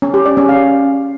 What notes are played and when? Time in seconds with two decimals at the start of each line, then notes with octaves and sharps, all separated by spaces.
0.02 C#4
0.14 G4
0.26 D5
0.37 C#4
0.49 F5